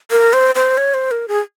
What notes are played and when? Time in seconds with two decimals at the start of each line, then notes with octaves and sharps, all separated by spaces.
0.11 A#4
0.33 C5
0.55 C5
0.77 C#5
0.94 C5
1.11 A#4
1.28 G#4